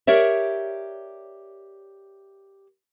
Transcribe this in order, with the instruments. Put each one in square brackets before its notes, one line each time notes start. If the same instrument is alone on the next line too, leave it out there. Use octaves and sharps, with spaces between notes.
[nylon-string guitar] G4 A#4 C#5 D5 E5